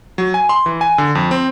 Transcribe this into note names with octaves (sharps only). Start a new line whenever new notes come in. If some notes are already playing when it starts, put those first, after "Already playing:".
F#3
G#5
C6
E3
G#5
D3
F2
C4